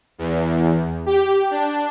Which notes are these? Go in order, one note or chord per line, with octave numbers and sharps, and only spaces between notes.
E2
G4
D4